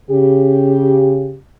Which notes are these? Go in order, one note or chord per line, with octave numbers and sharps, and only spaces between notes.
C#3 G4